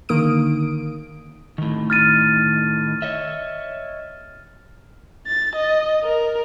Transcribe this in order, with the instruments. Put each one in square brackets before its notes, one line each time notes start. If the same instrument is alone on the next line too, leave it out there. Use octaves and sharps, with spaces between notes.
[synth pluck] D3 D#3 A#3 D#6 D7
[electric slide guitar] A2 D#3
[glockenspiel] F6 A6 D#7
[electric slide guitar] C#5 D#5 E5
[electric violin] A6
D#5
A#4